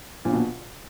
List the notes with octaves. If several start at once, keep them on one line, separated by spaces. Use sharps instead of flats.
A#1 A#2
B2